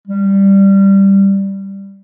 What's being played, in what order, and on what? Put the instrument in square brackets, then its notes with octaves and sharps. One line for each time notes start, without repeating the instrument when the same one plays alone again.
[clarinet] G3